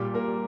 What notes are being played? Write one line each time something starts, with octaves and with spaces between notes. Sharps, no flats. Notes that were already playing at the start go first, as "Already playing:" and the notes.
Already playing: A#2 G3 G4
A#3 A#4
G3